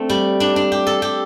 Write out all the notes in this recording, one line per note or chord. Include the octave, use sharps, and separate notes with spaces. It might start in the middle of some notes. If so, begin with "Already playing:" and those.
Already playing: A3 C4 D4
G3
D4
D4
G4
A4
G4